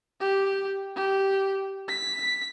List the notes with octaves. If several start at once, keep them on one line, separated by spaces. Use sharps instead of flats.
G4
G4
B6